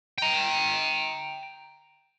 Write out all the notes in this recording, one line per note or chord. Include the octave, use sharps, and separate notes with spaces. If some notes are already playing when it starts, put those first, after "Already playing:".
G5 A#5